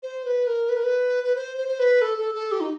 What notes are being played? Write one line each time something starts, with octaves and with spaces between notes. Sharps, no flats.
C5
B4
A#4
B4
A#4
B4
B4
C5
C5
C5
B4
A4
A4
A4
G4
D#4